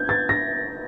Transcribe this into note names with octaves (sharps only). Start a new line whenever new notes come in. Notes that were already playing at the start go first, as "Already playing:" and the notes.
Already playing: G6 G#6
A6
A#6